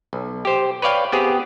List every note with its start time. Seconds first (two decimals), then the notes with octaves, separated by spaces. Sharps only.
0.13 B1
0.45 G4 C5
0.82 B4 C#5 D5 F5 G5
1.12 B3 C4 G4 G#4